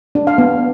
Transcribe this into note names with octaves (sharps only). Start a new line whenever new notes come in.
D4
F5
B3